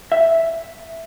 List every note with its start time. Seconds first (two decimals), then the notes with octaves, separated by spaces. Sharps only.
0.12 E5